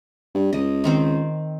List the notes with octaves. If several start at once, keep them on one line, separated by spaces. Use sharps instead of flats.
G2
C#2 D#5
D#3 C4 C5